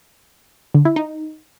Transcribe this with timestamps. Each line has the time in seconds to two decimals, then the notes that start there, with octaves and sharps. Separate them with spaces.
0.74 D3
0.85 E4
0.96 D#4